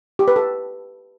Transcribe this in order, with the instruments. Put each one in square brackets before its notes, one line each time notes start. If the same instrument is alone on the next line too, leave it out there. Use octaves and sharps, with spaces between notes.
[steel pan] G4
B4
A4